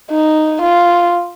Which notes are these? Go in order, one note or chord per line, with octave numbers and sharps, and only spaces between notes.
D#4
F4